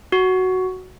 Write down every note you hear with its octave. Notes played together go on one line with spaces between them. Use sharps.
F#4